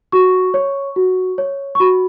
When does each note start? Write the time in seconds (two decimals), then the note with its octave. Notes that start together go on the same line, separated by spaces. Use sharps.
0.12 F#4 C#6
0.54 C#5
0.96 F#4
1.38 C#5
1.75 C#6
1.80 F#4 B5